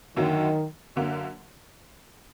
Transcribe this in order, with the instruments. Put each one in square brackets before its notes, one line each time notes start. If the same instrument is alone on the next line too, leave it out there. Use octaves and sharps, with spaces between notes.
[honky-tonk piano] F#2 D3 F#3 A#3 [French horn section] D#3
[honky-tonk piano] F#2 D3 F#3 A#3